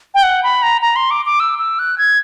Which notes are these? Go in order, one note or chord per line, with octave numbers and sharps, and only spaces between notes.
G5
F#5
B5
A#5
A#5
C6
D6
D6
E6
E6
F#6
G#6